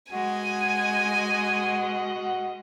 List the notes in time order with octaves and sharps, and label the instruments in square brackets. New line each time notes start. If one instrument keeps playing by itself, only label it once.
[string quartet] G#3 [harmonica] F#4 D#5 F#5 [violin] G#5